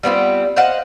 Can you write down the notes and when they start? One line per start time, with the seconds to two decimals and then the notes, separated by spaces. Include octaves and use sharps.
0.03 G3 B3 C4 F4
0.56 C5 D#5 F5 F#5